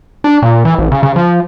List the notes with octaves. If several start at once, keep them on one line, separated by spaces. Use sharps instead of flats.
D4
A#2
E3
A1
C#3
C#3
F3